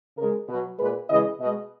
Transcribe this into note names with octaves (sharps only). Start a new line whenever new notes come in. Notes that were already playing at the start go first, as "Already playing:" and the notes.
C#3 G#3 A#4
B2 F#3 B4
A#2 G#3 B4
C#3 E3 G#3 D#5
B2 G#3 D#5